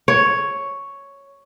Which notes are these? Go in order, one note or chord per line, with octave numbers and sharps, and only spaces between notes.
C#5